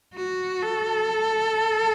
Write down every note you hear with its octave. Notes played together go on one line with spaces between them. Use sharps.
F#4
A4